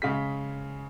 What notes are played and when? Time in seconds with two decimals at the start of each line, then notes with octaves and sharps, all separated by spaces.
0.02 C#3 G#3 B6